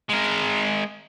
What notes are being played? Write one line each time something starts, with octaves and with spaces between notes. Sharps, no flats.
G#3 A#4